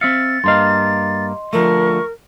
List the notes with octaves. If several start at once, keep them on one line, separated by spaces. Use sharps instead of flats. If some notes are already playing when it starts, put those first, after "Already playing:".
C4 E5 F5 A6 C#7
G2 A#3 D#5 F5 C6
D3 F3 A3 A#4 C#6